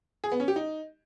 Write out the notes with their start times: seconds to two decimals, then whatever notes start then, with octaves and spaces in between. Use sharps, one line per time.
0.24 G#4
0.32 B3
0.40 C#4
0.48 G4
0.56 D#4